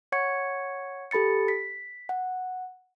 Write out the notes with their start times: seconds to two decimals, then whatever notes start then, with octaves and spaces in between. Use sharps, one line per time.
0.12 C#5 F#5 C#6 G#6 C#7
1.11 G4 A4 B5 A6 C#7
1.48 B6
2.09 F#5